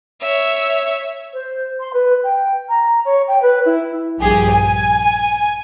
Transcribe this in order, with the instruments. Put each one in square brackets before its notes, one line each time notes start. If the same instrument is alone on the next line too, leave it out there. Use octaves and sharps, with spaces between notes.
[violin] C#5 E5
[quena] C5
C6
B4
G5
A#5
C#5
G5
B4
E4
[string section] A#1 G2 G4 G#4
G#5